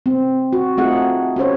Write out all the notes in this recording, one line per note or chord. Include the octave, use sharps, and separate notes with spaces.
C4
F#4
A3 C4 D#4 F4 G#4 F#5
C#4 G4 C5 C#5